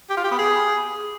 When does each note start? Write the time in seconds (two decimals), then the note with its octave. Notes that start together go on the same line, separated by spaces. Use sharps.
0.10 G4
0.17 F4
0.24 G4
0.31 B3
0.39 G#4